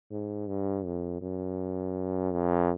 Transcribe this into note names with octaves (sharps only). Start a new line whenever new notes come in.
G#2
G2
F2
F#2
F2